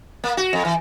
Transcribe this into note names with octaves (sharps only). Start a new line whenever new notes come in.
A#3
F#4
F2
E3